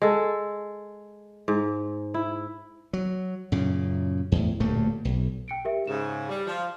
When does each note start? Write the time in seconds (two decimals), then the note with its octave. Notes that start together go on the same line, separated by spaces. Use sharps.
0.02 G#3 A4
1.48 G#2
2.14 E4
2.93 F#3
3.52 F#2 A#2 C#3
4.32 E2 A2
4.60 D1 G2 A#2 A3
5.05 B1
5.48 G5 C#7 D7
5.65 G4 A#4 E5
5.87 G#2 C#3 E7
6.29 G3
6.46 F3